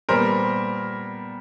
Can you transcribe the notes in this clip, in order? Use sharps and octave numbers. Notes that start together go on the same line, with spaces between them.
A#2 G3 B3 A#4 C5